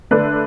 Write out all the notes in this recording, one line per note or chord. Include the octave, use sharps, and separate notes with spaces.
D3 A3 D4 B4